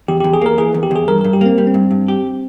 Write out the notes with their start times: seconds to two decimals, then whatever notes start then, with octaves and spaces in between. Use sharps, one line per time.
0.08 E2 G4
0.20 E2 G4
0.33 G#4
0.41 A#3 A#4
0.58 E3 G#4
0.74 E2
0.83 G4
0.91 E2 G#4
1.08 G2 A#4
1.21 G2 A#4
1.33 G4
1.41 A#3 C4
1.58 G3
1.67 C4
1.74 G2
1.91 G2
2.08 G4